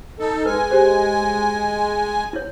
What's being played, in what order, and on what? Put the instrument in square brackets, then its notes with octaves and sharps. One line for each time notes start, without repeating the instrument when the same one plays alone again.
[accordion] D#4 A4
[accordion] G#3 G#5 [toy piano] B4
[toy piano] G4 C5
E4 C#5